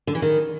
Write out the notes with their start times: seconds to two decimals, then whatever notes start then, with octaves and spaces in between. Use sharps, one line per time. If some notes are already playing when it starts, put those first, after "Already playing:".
0.07 D3
0.15 E3
0.22 D#3